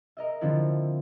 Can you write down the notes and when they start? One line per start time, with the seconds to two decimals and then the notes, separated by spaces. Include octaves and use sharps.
0.17 A#4 D#5 E5
0.41 D3 F3 C4 E4